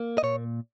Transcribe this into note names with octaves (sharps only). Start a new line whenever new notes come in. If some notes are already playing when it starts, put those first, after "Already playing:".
Already playing: A#3
D#5
A#2 C#5